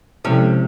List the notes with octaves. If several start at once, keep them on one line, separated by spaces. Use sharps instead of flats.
C3 F3 G#3 C#4 E4 A4